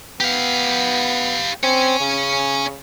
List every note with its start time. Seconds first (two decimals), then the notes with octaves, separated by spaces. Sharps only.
0.20 B3 G4 F5
1.63 C4 C#5 G#5
2.00 C#3